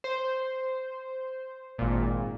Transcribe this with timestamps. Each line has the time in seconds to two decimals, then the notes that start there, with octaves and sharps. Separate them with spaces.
0.04 C5
1.78 G#1 A#2